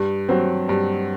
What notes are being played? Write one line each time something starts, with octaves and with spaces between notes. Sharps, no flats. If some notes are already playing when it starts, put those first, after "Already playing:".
Already playing: G2
F#3 C4
G2